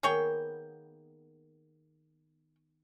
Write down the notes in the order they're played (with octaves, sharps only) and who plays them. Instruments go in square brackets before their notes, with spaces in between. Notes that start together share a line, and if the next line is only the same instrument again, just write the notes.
[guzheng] D#3 A#3 B3 [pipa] G#4 C#5 G5